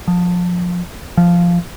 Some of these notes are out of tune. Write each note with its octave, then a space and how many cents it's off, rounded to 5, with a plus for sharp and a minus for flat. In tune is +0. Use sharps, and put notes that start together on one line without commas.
F3 +25
F3 -5